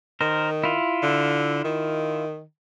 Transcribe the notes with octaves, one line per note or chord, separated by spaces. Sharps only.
D#3 A#4 C5
E4 F4
D3
D#3